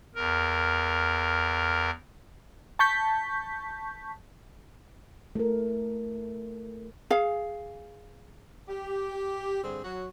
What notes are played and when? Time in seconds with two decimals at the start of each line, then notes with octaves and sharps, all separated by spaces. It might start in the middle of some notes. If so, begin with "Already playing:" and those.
0.15 E2 A#4
2.79 A5 C#6 G6 B6
5.35 A3 A#4
7.11 G#4 F5
8.68 G4
9.63 G2 D3 C4 G#4 C5
9.84 F#3 F#4